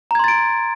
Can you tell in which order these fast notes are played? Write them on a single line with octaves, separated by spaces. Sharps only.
A#5 G#6 C6 A6 D7